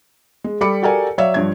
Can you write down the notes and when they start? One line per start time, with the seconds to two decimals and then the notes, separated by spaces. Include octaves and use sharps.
0.44 G#3
0.61 G3 A4 B5 D6 C#7
0.82 F#4 G4 A4 A#4 D5 G#5
1.18 F#3 C#5 D5 E5 F5
1.34 G2 F3 C#5 G#6